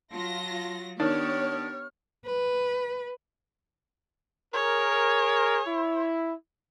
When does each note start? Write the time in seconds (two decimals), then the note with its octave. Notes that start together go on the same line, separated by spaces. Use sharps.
0.12 F#3 F4 A5 A#6
1.00 D#3 B3 D4 G4 C#5 F6
2.25 B4
4.54 G#4 A#4 C#5
5.67 E4